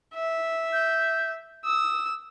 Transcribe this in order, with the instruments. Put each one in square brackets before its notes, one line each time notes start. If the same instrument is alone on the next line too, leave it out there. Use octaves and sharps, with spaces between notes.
[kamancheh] E5
[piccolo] G6
[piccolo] D#6 [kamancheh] E6